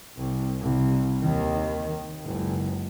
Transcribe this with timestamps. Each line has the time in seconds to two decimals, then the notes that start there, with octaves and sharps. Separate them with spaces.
0.17 C2
0.62 C2
1.20 D#2 D#3
2.24 F#1 C#2